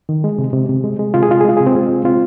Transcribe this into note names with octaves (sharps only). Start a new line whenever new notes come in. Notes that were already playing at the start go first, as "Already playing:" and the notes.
D#3
G#3
C3
C3
C3
G#3
G#3
C3 F4
G#4
C3 F4
G#4
G#3 F4
C3 G#4
C4 F4
G#3
G#3
C3 C4 F4